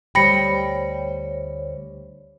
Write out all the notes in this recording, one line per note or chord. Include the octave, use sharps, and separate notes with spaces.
D2 G3 C5 C#5 G5 B5 A#6 C#7